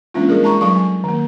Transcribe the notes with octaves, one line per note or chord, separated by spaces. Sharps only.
E3 G#3 A#3 C#4 D4 F4
G3 G#4 A#4
G#3 D#4 A5 A#5 C#6
F#3 G3 A4 F5 A5 C#6
G#5
D#3 A#3